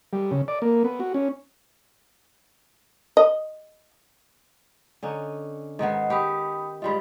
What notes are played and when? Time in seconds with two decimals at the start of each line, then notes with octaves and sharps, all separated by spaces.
0.13 G3
0.31 C#3
0.48 D5
0.62 A#3
0.84 B3
1.00 F#4
1.14 C#4
3.17 D#5
5.03 D3 C#4 D#4
5.79 G#2 D#3 B3 D#5 F#5
6.10 G4 G5 B5 D#6
6.82 G#2 G3 F4 D#5 B5